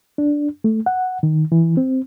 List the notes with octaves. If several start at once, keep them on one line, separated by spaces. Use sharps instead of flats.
D4
A3
F#5
D#3
E3
C4